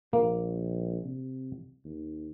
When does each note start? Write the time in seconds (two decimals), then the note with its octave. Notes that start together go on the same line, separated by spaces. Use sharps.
0.13 A#1 A#3
1.04 C3
1.85 D#2